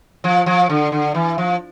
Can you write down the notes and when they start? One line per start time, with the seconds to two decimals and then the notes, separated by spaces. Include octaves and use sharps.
0.24 F3
0.46 F3
0.70 D3
0.92 D3
1.15 E3
1.38 F3